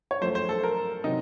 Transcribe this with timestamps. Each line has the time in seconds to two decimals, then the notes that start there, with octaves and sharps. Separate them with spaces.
0.11 C#5
0.21 F#2 F3 A3 C5
0.35 C5
0.49 A4
0.63 A#4
1.04 C3 F#3 D#4